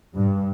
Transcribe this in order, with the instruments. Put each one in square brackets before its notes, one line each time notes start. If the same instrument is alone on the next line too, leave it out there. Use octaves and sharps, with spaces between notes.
[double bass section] G2